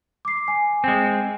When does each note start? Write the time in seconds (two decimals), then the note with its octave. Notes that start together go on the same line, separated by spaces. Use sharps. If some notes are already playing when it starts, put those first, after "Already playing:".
0.25 D6 C7
0.48 G#5
0.84 G#3 C4